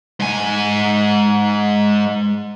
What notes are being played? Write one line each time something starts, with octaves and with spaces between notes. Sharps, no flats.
G#2 G#5